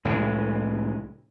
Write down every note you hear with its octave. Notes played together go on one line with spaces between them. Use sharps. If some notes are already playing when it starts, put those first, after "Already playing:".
C2 A2 E3 G#3